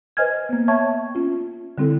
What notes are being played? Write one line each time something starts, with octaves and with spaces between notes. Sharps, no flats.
B4 C5 D#5 G#5 F6 G#6
A#3 B3
C#5 E5 G5 A5 C#6 G#6
C#4 F4
D3 G3 C4 E4 A4